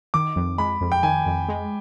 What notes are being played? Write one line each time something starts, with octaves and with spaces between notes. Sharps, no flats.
D#3 D6
F2
G#3 B5
F2
G5
D#3 G#5
F2
G#3